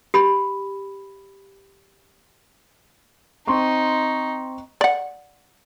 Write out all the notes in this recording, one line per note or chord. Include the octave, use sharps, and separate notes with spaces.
G4 B5
C4 D#4 C6 C#6
D5 F#5